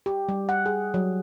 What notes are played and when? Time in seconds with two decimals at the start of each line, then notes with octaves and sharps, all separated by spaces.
0.06 G4
0.29 G3
0.49 F#5
0.66 G#4
0.94 F#3